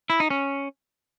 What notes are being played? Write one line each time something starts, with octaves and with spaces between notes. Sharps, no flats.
E4
D#4
C#4